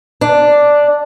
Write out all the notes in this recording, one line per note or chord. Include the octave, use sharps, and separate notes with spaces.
D4